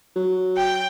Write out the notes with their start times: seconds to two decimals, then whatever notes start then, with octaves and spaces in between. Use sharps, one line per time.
0.16 F#3
0.57 G5